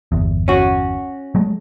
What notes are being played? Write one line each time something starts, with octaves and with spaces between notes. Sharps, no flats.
G1 E2
C#4 F#4
F#3 G#3 A3